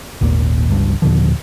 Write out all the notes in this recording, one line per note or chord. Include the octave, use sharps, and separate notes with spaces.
G#1 D#2 A#2
G1 C#2 G2
D#2 A#2 D3 F3